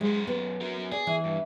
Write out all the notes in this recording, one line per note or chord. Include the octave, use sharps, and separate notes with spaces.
F#2 G#3 C5
B3
F#3 A#4
G#4 D5
E3
G2